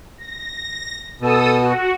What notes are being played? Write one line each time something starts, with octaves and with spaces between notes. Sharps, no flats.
A#6
B2 A4 D#6 E6
F#4